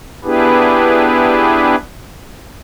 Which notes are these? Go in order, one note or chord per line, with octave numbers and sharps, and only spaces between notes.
B3 D4 E4 G4 G#4 B4